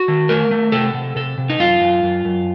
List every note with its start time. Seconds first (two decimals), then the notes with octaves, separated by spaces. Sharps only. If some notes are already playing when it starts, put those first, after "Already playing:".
Already playing: F#4
0.08 D#3
0.29 A3 A#4
0.51 A3
0.72 C3 A4
0.94 C3
1.16 C3 A4
1.38 C3
1.50 D#4
1.59 F#2 F4
1.81 F#2
2.03 F#2
2.25 F#2